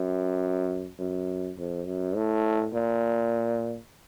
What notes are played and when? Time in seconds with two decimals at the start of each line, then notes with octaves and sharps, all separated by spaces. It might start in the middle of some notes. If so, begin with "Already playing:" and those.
Already playing: F#2
0.99 F#2
1.58 F2
1.86 F#2
2.16 A2
2.74 A#2